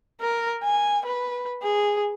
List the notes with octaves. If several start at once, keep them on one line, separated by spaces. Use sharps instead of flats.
A#4
G#5
B4
G#4